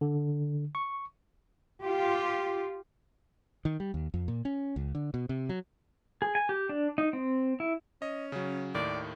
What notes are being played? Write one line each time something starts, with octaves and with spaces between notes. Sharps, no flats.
D3
C#6
F4 G4
D#3
G3
D#2
F2
A#2
C#4
C#2
D3
B2
C3
F#3
G#4
G#5
G4
D4
D#4
C4
E4
C#4 D#5
C#3 F#3
D#2 A2 D#3 D5